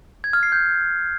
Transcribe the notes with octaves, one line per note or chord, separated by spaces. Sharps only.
G#6
F6
C7
G6